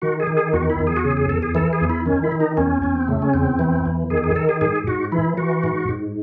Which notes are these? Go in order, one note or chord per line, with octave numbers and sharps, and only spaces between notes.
D#3 F#4
G#4
D#3
G#4
E2 F#4
E4
E2
G#4
F#4
C#3 G#4
G#4
E2 A4
G#4
E3 A4
G#4
E2
E4
D#3 C#4
E4
D#3
D#4
E2 C#4
E2 C#4
C4
C#3 A3
C#4
E2 C4
E3
E2
D#3 G#4
G#4
D#3 A4
G#4
G#2 G#4
G#2 F#4
E3 E4
E3 F#4
G#2
G#2